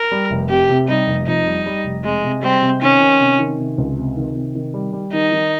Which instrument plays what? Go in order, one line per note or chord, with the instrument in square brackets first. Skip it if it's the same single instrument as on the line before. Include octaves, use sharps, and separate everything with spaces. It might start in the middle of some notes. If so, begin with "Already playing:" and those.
Already playing: [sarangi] A#4
[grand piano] G3
F1
[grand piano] C3 [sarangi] G4
[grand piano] C3
[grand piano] G3 [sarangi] D#4
[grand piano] F1
[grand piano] F2 [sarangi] D#4
[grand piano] G3
G3
F1
[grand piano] C3 [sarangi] G#3
[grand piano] C3
[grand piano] G3 [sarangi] C4
[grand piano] C3
[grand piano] D#3 [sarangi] C#4
[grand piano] D#3
C3
D#3
C3
C#2
C3
D#3
C3
D#3
G3
G3
[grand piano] D#3 [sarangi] D#4
[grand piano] D#3